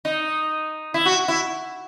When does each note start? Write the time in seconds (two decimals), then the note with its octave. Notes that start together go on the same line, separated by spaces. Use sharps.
0.05 D#4
0.94 E4
1.05 F#4
1.28 E4